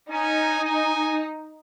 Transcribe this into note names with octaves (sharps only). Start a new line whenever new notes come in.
C#4 D#4 G#5
D#5 G#5